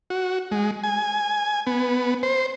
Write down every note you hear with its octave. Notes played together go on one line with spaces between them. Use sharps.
F#4
G#3
G#5
B3
C5